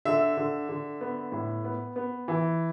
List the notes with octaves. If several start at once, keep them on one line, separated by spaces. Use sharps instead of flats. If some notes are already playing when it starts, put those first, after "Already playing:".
D3 E5
D3
D3
B3
A2
B3
B3
E3